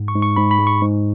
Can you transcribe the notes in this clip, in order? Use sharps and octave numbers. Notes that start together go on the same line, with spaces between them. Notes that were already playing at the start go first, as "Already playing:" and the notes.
Already playing: G#2
C#6
G#2
C#6
G#2 B5
B5
G#3
C#6
G#2